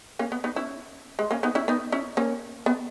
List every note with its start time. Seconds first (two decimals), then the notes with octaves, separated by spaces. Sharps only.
0.19 A#3 C#4
0.32 B3
0.44 B3 D#4
0.56 C#4 E4
1.19 G#3
1.31 A#3 C#4
1.43 B3 D#4
1.55 C#4 E4
1.68 B3 D#4
1.92 C#4 E4
2.17 A#3 C#4
2.66 B3